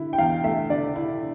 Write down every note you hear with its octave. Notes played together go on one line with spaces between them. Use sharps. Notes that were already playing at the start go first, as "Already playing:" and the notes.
Already playing: D3 E4
G5
E2 F5
A3 E5
D3 D5
E4